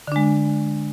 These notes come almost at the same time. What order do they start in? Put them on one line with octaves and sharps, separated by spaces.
D3 D4 G#3